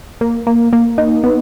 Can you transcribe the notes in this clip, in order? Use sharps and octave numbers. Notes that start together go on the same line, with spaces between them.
A#3
A#3
A#3
D#4
B3